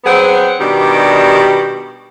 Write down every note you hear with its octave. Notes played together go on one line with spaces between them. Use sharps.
F#3 B3 C4 G#4 F#5
B2 D#3 G3 D4 G4